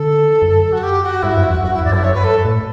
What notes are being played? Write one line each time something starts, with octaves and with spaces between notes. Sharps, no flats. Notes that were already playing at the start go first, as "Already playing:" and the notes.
Already playing: D3 A4
F#2
F#4
G4
F#4
G2 E4
F#2
F#4
E2
F#2 F#4
G2 E4
E2 D5
F#2 E4
G2 C#5
B4
A4
A2